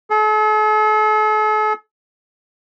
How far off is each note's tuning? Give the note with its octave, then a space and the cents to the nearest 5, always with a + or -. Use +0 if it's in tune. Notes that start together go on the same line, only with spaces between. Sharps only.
A4 -45